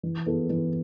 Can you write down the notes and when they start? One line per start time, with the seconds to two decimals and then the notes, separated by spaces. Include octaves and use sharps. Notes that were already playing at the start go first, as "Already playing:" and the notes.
0.03 E3
0.26 B3 E4 A4
0.50 E3